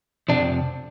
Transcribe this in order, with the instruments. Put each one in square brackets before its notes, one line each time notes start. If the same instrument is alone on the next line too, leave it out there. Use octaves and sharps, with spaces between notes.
[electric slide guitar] F2 C3 F3 D4